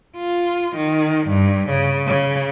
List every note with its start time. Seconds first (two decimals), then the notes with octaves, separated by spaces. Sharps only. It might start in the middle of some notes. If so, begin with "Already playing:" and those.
0.17 F4
0.76 D#3
1.28 G2
1.70 C#3
2.07 C#3